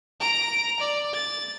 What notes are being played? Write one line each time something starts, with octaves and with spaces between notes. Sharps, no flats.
A#5 D7
D5
A6